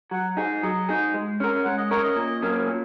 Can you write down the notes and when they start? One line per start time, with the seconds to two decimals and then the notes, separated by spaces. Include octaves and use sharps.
0.11 F#3 F#5
0.37 D#4 G#4
0.62 F#3 D#5
0.89 D#4 G#4
1.14 G#3
1.40 C#4 A#4
1.65 G#3 F#5
1.78 D#5
1.91 C#4 A#4 C#5
2.04 D#5
2.16 A#2
2.42 F#3 A#3 C#4
2.67 A#2